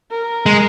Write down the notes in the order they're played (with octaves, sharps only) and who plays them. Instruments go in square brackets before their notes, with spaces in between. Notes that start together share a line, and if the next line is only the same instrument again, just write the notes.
[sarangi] A#4
[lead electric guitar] G#3